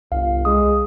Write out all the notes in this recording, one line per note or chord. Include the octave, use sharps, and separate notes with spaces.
G1 C2 F5
G#3 D#6